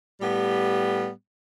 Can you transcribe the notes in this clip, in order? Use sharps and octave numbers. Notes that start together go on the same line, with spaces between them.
A2 G3 B3 G4